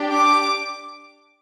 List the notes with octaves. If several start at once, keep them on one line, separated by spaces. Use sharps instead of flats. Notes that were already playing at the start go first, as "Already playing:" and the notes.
Already playing: D4 G4
D6